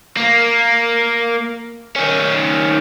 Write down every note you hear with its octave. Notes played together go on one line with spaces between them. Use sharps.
A#3
D#3 C#4